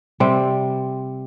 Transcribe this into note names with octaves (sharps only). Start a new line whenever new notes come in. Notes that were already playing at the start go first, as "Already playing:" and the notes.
C3 G3 C4